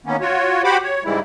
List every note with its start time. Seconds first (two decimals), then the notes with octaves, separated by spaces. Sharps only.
0.06 D#3 A#3 B3 C#4
0.21 F4 F#4 C#5
0.64 F#4 G4 C5 F#5 B5 D6
0.84 C#5
1.04 G#2 C#3 E3 G3 G#3 E4